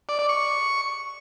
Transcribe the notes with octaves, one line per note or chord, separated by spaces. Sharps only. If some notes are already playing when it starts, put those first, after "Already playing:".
D5
D5
C#6